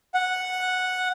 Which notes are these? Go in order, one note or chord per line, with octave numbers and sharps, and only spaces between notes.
F#5